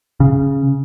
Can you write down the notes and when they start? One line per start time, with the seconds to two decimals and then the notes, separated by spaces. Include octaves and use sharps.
0.20 C#3